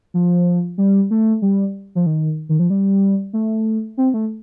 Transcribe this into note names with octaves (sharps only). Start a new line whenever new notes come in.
F3
G3
A3
G3
F3
D#3
D#3
F3
G3
A3
C4
A3